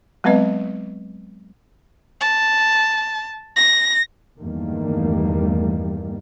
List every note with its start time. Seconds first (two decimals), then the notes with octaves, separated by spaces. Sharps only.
0.24 F#3 G#3 B3 C4 B4 D#5
2.21 A5
3.56 A#6
4.38 E2 G2 D#3 G3 A3 A#3